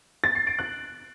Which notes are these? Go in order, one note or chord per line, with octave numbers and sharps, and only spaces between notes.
A6
C7
D7
F#6